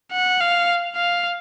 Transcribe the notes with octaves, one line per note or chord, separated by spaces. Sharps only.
F#5
F5
F5